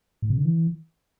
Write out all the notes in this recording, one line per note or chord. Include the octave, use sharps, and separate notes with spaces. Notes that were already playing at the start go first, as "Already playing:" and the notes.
A2
C3
D3
E3